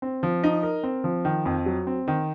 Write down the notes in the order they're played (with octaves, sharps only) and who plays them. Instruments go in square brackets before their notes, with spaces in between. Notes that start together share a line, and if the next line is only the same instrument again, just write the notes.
[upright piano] C4
F3
D#4
A#4
C4
F3
D#3
F2
F#3
C4
D#3